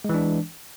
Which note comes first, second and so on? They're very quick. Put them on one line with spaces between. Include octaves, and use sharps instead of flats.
G#3 E3 D4